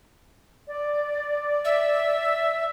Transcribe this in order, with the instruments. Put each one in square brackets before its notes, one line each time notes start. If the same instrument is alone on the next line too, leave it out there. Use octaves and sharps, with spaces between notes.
[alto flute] D5
[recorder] E5